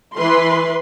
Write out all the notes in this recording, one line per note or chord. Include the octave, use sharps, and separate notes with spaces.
E3 B4 C6